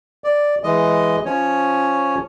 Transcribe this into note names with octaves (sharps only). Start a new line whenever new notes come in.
D5
E3 G#3 D#5
F3 C#4 C#5